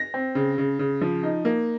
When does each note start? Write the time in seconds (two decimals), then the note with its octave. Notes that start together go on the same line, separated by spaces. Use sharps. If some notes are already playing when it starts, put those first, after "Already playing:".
Already playing: A#6
0.14 C4
0.35 C#3
0.58 C#3
0.79 C#3
1.01 F3
1.23 D#4
1.45 A#3